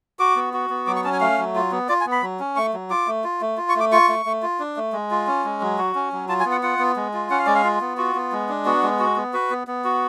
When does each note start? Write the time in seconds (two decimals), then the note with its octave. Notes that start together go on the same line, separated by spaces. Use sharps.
0.19 F#4 D6
0.36 B3
0.54 F#4
0.70 B3
0.87 F#3 D6
0.96 C#6
1.04 C#4 A5
1.13 G#5
1.20 A3 F5
1.38 F#3
1.55 F4
1.72 B3
1.89 F4 D5
2.01 G#5
2.06 B3
2.12 B5
2.22 F#3
2.40 C#4
2.56 A3 C#6
2.74 F#3
2.90 F4 D6
3.07 A3
3.24 F4
3.41 A3
3.57 F4
3.69 C#6
3.76 A3 D6
3.92 F4 C#6
4.09 A3
4.26 A3
4.42 F4
4.59 D4
4.76 A3
4.93 G#3
5.11 F4
5.27 C#4
5.44 G#3
5.61 F#3
5.78 F#4
5.95 C#4
6.12 F#3
6.29 F4 A5
6.40 G#5
6.46 B3
6.52 F#5
6.63 F4 F#5
6.79 B3
6.96 G#3
7.13 F4
7.30 C#4 F#5
7.38 F5
7.46 G#3 D5
7.55 F5
7.64 F4
7.81 B3
7.97 F4 F#4
8.15 B3
8.32 G#3
8.49 D4
8.65 B3 F#4
8.83 G#3
8.99 F#4
9.16 B3
9.33 F#4 B4
9.50 B3
9.67 B3
9.84 F#4